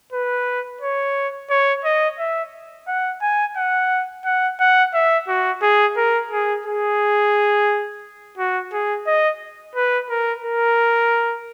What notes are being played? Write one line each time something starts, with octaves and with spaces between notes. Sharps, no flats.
B4
C#5
C#5
D#5
E5
F#5
G#5
F#5
F#5
F#5
E5
F#4
G#4
A#4
G#4
G#4
F#4
G#4
D#5
B4
A#4
A#4